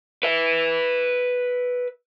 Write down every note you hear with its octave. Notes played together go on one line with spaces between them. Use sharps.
B4 E5